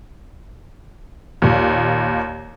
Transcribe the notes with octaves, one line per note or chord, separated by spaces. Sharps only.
D#2 A#2